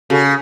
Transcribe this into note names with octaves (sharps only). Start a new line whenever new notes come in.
C#3 F#4 A4